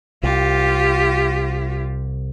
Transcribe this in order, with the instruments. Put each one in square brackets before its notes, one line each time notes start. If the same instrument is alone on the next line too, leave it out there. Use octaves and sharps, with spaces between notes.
[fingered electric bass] C2 [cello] F4 G4